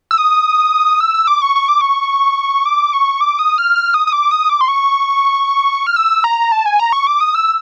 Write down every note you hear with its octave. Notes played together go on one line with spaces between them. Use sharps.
E6
D#6
E6
E6
D6
C#6
C#6
D6
C#6
D6
C#6
D6
D#6
F6
F6
D#6
D#6
D6
D#6
D6
C6
C#6
F6
E6
A#5
A5
G#5
A#5
C#6
D6
D#6
E6